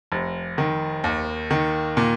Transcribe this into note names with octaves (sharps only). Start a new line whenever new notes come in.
F1
D#3
D#2
D#3
A#2